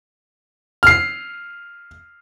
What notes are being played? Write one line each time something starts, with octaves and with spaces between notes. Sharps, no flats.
F6 C7